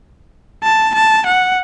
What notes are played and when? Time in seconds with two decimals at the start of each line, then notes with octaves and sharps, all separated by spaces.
0.64 A5
0.95 A5
1.26 F#5